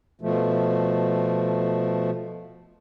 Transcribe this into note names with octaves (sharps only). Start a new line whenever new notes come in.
B2 F3 A3